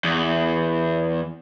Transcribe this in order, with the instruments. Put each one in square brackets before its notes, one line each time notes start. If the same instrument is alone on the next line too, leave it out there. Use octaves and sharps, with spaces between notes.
[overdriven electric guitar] E2